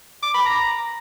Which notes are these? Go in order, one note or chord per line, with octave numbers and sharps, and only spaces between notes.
D6
B5
A#5